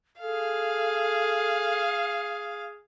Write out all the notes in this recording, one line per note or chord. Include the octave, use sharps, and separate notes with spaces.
G#4 A4 F5